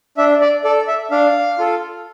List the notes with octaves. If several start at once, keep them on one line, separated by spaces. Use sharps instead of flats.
D4 E5
D5
A4 D5
E5
D4 F5
F4 A4